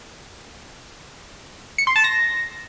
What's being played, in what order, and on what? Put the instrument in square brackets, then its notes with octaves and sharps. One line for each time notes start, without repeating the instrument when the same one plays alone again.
[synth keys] C#7
C6
A5
A#6